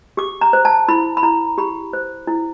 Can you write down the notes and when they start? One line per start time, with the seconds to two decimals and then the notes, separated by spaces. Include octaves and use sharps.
0.17 G4 D6
0.41 A#5
0.53 C5
0.65 A5
0.89 E4 B5
1.17 B5
1.23 E4 A#5
1.58 G4 B5
1.93 C5
2.27 E4